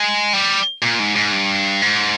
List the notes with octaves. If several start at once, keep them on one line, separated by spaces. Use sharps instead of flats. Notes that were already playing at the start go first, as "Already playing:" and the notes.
Already playing: G#3
G3
A#2
G#2
G#2
G2
G#2